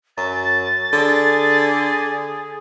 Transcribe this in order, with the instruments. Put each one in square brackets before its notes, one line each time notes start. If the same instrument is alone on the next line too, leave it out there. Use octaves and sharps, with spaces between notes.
[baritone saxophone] F#2 [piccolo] A6
[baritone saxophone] D3 [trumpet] G#4